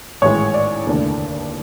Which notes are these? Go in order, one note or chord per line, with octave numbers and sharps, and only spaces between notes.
A1 G#2 D#3 G#3 C#5
D5
F1 D#2 D3